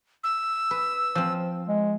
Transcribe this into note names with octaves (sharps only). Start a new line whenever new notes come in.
E6
B4
F3 C4
G#3